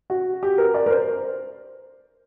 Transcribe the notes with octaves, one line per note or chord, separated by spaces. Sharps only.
F#4
G4
A#4
D5
A#4
C5